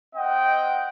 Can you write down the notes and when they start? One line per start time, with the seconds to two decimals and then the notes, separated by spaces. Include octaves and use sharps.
0.15 C4 D#5 F#5 G5